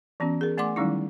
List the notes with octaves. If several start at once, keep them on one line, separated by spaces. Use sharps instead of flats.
E3 B3 C#4 F#4
G#4 A#4
A3 D5 F#5 G#5 C6 D6
D#3 F#3 G3 C#4 D#4 E4